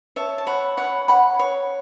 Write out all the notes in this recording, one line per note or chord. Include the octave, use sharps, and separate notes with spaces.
C#5 E5 A5
A5
C#5 F#5 B5
C#5 F#5 B5
C#5 F#5 B5
C#5